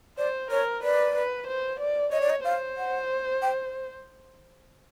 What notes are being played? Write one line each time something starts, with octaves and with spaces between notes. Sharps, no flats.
C5 D5
A#4 C#5
B4 D5
B4
C5
D5
C#5 D#5
D5
D#5
C5 F5
F#5
G5